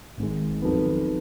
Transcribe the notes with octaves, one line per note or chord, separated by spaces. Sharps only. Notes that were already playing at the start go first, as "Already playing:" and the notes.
G#1 G#2 D#3 G#3
F2 D#3 F#3 B3